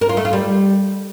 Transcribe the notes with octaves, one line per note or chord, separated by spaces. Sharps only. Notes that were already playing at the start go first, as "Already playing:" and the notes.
A#4
F4
A3
F4
G3